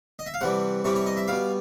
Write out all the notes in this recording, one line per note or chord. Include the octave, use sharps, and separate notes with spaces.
D#5
E5
F5
C3 E3 G3 F#5
C3 E3 G3 C#5
C#5
D#5
E5
B2 G3 F5